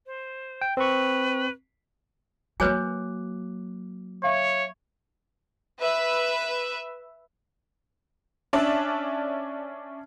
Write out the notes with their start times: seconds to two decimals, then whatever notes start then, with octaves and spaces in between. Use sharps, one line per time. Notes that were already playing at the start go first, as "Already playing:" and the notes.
0.06 C5
0.61 G5
0.77 C4 B4 C#6
2.60 F#3 A#3 F#4 B4 C#5 G#5 D6 F#6
4.24 C#5 E5 F5
5.79 B4 E5
8.53 C#4 D4 D5 E5 A5